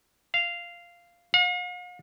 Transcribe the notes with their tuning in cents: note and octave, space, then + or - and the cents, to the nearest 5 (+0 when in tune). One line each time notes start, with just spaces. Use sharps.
F5 -10
F5 +45